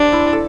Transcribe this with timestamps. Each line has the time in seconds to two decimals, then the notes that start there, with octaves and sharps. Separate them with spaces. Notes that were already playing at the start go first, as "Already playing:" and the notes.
Already playing: D4 G4 C5 E5
0.12 E4
0.33 A4